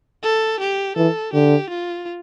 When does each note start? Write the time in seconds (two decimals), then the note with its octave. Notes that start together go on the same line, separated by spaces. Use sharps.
0.23 A4
0.60 G4
0.96 E3 A4
1.33 D3 G4
1.70 F4